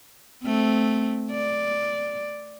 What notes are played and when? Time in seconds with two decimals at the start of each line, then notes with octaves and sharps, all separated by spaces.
0.44 A3 C4
1.31 D5